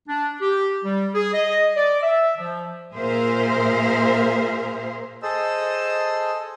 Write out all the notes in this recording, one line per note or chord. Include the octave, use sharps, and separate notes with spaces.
D4
G4
G3
G#4
D#5
D5
E5
F3
A#2 G#4 A#4 C5 E5 F5
G#4 A4 C5 D#5 A5 E6